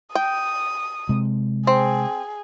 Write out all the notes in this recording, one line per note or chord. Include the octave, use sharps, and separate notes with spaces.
G5 D#6
C3 G#3
C4 G#4